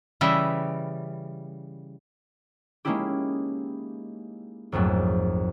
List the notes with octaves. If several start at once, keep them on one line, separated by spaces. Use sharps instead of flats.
C#3 E3 G3 D#5 E5
G#3 A#3 C#4 D#4 E4 G4
A#1 F2 G#2 F#3 A3